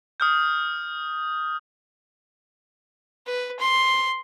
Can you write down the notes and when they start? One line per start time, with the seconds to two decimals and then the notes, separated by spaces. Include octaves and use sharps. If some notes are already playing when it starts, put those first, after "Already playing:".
0.20 D#6 F6 G6
3.26 B4
3.60 C6